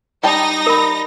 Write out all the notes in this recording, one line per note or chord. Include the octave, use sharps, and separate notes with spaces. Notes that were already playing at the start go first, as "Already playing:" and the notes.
G3 D#4 G5 A5 A#6
A#4 B5